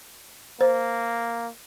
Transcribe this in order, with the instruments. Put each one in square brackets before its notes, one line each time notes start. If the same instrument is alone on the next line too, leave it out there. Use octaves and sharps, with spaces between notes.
[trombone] A#3 [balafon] C5